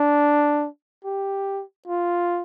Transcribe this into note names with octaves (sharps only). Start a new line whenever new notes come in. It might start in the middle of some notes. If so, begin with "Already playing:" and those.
Already playing: D4
G4
F4